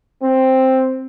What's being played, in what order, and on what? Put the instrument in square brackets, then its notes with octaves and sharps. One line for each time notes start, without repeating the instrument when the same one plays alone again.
[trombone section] C4